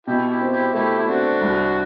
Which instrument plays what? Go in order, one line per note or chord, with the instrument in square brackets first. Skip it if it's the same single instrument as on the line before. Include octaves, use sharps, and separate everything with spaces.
[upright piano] B2 [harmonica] E4 G4
[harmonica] E4 G4
[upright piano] C4
[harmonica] E4 G4
[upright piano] A3 [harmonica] E4 G4
[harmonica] E4
[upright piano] C4 [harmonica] D4 F#4
[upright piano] C2